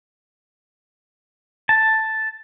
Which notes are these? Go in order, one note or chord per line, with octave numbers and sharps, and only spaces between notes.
A5